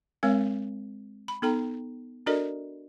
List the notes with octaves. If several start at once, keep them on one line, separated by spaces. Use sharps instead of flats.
G#3 C4 A#4 C#5 F5
B5
B3 D#4 A4 G5 A#5
D4 F#4 A4 A#4 D5 D#5